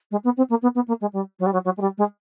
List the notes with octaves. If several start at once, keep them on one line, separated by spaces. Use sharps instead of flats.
G#3
B3
C4
A#3
B3
B3
A#3
G#3
G3
F#3
G3
F#3
F#3
G#3
G3
G#3